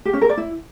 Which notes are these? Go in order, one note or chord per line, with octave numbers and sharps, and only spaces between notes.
G4
C#4
A#4
D5
E4